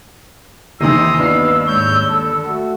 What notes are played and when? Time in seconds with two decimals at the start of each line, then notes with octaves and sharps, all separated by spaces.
0.81 D#2 C3 D#3 E3 A#5 C6 D#6 E6
1.19 G2 B3 D#4 F5 C7
1.67 G#2 C#5 G6
2.10 A4
2.46 A3 F#4